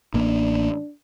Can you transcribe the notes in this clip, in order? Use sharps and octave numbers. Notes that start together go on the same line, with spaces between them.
A1 A#3 D4